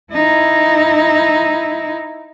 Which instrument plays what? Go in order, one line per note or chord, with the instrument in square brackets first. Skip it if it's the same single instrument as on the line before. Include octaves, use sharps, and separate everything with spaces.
[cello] D#4 E4